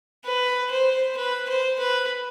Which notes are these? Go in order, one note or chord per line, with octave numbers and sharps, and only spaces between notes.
B4
C5
B4
C5
B4